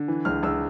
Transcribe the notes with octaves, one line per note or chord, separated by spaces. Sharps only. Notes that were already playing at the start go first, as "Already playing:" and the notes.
Already playing: D3
E3
C#2 F6
C#2 E6